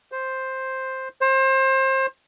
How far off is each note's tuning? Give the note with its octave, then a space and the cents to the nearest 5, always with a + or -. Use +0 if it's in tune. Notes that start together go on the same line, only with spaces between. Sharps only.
C5 +5
C5 +30